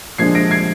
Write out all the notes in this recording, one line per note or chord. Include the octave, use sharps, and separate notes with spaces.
A#2 F3 G#3 D4 G#6 C7
A#6 D7
G#6 C7